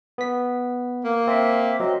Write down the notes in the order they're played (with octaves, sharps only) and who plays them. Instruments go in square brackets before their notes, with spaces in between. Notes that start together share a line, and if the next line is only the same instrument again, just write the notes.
[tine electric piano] B3 B6
[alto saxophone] A#3
[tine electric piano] C4 [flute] E5
[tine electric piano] F#3 C4 [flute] D#5